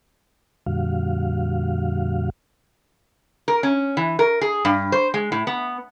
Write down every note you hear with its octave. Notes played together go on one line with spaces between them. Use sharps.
F2 A#2 D3 G3 F#4 F5
A#4
C#4
E3
A#4
G#4
G2
C5
G#3
A2
B3